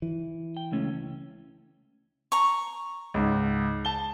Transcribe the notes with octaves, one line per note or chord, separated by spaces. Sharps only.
E3
G5
C#2 A3 C#4
A#5 C#6
C#2 G#2
A5 G7